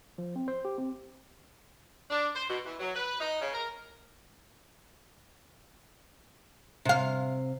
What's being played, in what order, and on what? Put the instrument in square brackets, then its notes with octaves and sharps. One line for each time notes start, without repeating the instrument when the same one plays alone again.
[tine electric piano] F3
C4
C5
G4
C4
[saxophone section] D4
C5
B2
E3
F#3
B4
D#4
C#3
A#4
[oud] C3 F5